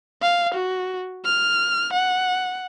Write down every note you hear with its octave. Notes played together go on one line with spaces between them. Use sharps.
F5
F#4
F6
F#5